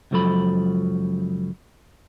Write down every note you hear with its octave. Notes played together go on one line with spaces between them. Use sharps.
C#2 F#2 F3 F#3 A4 B5